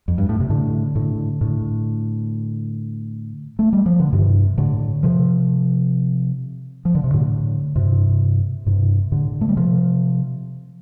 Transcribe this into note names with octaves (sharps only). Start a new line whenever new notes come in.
F2
G2
A2
C3
A2 D3
A2 D3
A2 D3
A3
G3
F3
D3
G2 C3
A2 D3
C3 F3
F3
D3
C3
A2 D3
G2 C3
G2 C3
A2 D3
A3
G3
C3 F3